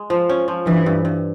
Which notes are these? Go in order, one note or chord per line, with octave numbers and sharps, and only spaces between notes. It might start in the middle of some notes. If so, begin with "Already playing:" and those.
Already playing: G#3
F3
C#4
F3
G2 E3
G2
G2